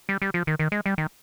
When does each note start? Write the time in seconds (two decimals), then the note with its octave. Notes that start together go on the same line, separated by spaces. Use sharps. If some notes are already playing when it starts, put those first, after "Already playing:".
0.09 G3
0.22 G3
0.34 F3
0.47 D#3
0.59 D#3
0.72 G#3
0.86 G3
0.98 D#3